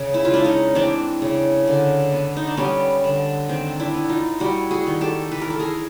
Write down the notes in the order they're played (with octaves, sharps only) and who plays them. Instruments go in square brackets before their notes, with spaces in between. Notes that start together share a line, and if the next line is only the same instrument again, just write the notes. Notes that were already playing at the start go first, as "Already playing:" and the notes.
Already playing: [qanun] C#3
E4
F4
G#3 D4 E4
C#4 D#4
E3 C4 D4
C#3
D3
B3
D#4
D4
G3 B3 C#4
D3
D#3 C4
D4 E4
B3
D#4 F4
G3 E4 F#4
F#4 G#4
D#3
G4 A4
E3 B4
A#4
A4
G#4 A#4